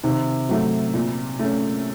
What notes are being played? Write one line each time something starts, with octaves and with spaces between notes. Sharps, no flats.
C3 D#3
F#3 A3
A#2
A3 C#4